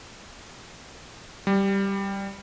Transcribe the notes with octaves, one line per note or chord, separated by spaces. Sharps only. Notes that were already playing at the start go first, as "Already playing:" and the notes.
G3